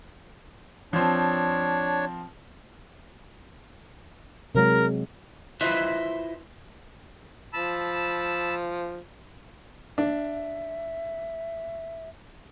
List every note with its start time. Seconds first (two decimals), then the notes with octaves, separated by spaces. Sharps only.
0.93 F3 C4 D4 C#5
4.55 C3 F#3 G#3 A#4
5.61 E4 F4 B4 C5 D#5 E5
7.53 F3 A5 B5 E6
9.98 D4 E5